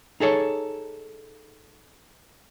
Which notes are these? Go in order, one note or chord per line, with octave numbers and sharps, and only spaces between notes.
D#4 G#4 A4 C#5